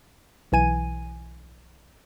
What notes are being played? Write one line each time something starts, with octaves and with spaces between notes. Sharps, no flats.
B1 E3 G#5 D#7